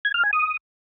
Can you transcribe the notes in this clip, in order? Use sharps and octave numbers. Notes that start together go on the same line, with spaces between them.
G#6
F6
G#5
D#6